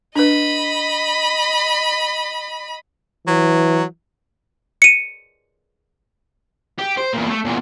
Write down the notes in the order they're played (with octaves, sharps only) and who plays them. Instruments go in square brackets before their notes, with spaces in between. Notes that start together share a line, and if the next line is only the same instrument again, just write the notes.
[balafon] D4 B4 [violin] D#5 B5
[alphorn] E3 [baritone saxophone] F#3
[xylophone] C#7 D#7
[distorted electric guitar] G4
C5
E2 A#2
A3 A#3
E2 A#2